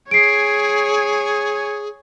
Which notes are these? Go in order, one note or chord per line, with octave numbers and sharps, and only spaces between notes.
G#4 C#5 G#5 C7 D7